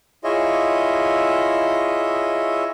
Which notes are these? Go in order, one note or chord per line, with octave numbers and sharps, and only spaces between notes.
E4 F4 G#4 C#5 D#5 E5